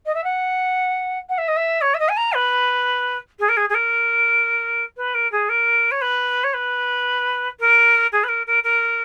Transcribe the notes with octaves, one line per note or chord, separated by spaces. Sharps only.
D#5
E5
F#5
F#5
E5
D#5
E5
C#5
E5
D#5
G#5
A#5
B4
G#4
A#4
G#4
G#4
A#4
B4
A#4
G#4
A#4
C#5
B4
C#5
B4
A#4
G#4
B4
A#4
A#4
A#4